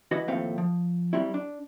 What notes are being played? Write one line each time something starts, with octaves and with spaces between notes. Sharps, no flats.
E3 E4 F#4 B4 D#5
D#2 A2 F3 A3 C4 F5
F3
F#3 G3 C4 E4
D4